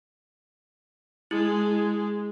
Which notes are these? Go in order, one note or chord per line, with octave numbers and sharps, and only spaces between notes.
G#3 E4